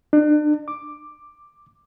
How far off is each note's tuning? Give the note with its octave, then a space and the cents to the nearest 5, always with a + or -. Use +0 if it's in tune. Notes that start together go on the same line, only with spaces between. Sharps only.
D4 +35
D6 +5